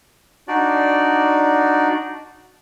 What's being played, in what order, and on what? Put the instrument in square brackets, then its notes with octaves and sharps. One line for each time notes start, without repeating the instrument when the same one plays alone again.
[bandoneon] D4 D#4 F#4 D5